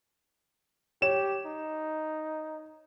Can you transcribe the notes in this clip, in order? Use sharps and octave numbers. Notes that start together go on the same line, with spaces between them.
G4 C#5 E7
D#4